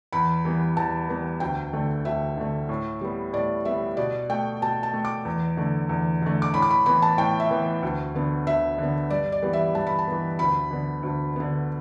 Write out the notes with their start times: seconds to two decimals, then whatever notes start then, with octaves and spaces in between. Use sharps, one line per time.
0.13 E2 B5
0.45 E3 G3 B3
0.77 E2 A5
1.09 E3 G3 B3
1.40 D2 G5
1.73 D3 A3
2.05 D2 E5
2.37 D3 A3
2.69 A2
3.01 G3 B3
3.33 A2 D5
3.65 G3 B3 E5
3.97 B2 D5
4.29 A3 G5
4.61 B2 A5
4.83 A5
4.94 A3
5.05 D6
5.25 E2
5.57 D3 A3
5.89 E2
6.22 D3 A3
6.42 D6
6.54 A2 B5
6.62 D6
6.71 B5
6.86 E3 B3 B5
7.02 A5
7.18 A2 G5
7.40 E5
7.50 E3 B3
7.83 D2
8.15 D3 B3
8.46 D2 E5
8.78 D3 B3
9.10 G2 D5
9.32 D5
9.42 E3 G3 B3
9.53 E5
9.75 G2 A5
9.87 B5
9.99 A5
10.07 E3 G3 B3
10.39 D2 B5
10.71 D3 B3
11.03 D2
11.36 D3 B3